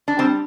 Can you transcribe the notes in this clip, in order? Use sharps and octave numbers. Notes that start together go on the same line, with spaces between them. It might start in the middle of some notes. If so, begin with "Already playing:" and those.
D4
G3 C4